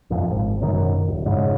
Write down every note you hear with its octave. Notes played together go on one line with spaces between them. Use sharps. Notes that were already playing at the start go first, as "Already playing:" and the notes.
F1 A#1 F2
G#1
F#1 F#2 B2 D#3
D#1
F1 G#2 C#3